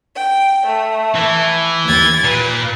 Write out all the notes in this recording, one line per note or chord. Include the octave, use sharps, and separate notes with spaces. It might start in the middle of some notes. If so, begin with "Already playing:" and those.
G5
A3
E3
D#2 G#6 A6
A#2 B4